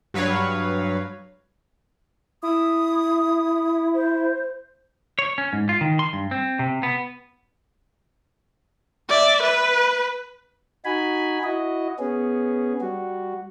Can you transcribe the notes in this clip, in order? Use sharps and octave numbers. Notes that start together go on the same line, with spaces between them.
G2 F#3 B4 C#5 F5
E4 D#6
C5
C#5
C#4
G#2
F4
D#3
C6
G2
C4
C3
B3
D5 E5
B4
D#4 F#4 G#5 B5
E4 F#4 D#5
B3 C#4 G#4
G3 F#4